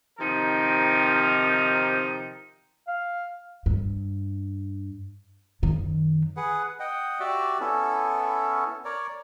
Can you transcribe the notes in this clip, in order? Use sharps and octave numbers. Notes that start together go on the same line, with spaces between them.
C3 D#3 F3 D#4 G4 A#4
F5
G2
F#2 D#3
G#4 B4 F#5
D#5 F#5 G5
F#4 G4 D5 E5
B3 C#4 E4 A4
A#4 C#5 D5